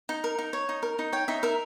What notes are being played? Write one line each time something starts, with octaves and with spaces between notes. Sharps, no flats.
D#4
A#4
D#4
C#5
D#4
A#4
D#4
C#5 G5
D#4 E5
A#4 E5